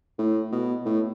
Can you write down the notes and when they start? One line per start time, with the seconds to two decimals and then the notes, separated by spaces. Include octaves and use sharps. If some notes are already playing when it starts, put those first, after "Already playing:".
0.19 A2
0.52 B2
0.85 A2